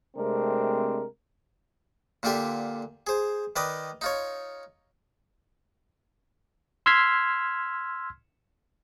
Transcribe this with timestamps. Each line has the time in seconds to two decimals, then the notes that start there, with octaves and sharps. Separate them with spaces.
0.16 C3 G#3 A3 C4 D4 A#4
2.23 A#2 D3 F4 G4 E5 C6
3.07 G#4 C5
3.56 D#3 B4 D5 D#5 D#6
4.01 D#4 F4 C#5
6.86 C6 E6 F6 G#6 B6 C7